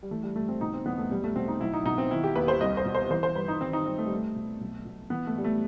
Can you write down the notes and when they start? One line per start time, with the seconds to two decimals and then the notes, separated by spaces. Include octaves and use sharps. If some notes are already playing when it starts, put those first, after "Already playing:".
0.03 G3
0.11 E3 A3
0.23 G3
0.36 G2 A3
0.49 C4
0.61 B2 D#4
0.74 C4
0.86 E2 B3
0.98 A3
1.11 B1 G3
1.24 A3
1.36 B2 C4
1.48 D#4
1.61 B1 E4
1.74 D#4
1.85 B2 D#4
1.98 C4
2.11 D#3 E4
2.24 G4
2.36 D#2 B4
2.48 C5
2.61 C2 D#5
2.77 C5
2.85 B2
2.95 C5
3.11 E3 C5
3.23 C5
3.35 G2 B4
3.48 D#4
3.60 D#3 C4
3.73 D#4
3.86 G2 C4
3.98 A3
4.06 G3
4.11 C2 A3
4.36 B2
4.61 B1
4.85 B2
5.10 E3 B3
5.27 A3
5.35 A2 G3
5.44 A3